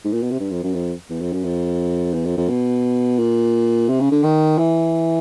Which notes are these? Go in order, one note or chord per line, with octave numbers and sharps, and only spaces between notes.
G#2
A#2
B2
C3
G2
F2
F#2
F2
E2
F2
F#2
F2
E2
F2
F2
B2
A#2
C3
C#3
D3
D#3
E3